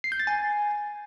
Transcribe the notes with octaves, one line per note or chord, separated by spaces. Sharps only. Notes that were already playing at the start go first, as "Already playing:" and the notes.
C7
G6
A6
G#5